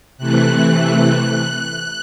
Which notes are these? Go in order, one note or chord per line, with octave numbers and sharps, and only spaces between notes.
C3 E3 A3 F#6